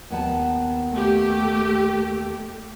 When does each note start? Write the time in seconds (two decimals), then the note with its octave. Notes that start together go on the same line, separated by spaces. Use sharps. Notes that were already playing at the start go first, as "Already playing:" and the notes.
0.10 D#2 B3 A5
0.93 A3 G4